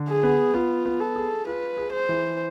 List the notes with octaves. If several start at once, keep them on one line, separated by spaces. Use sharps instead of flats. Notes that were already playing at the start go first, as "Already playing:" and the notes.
Already playing: D3
G#4
B3
B3 F4
B3
A4
G#4
F4 B4
G#4
C5
E3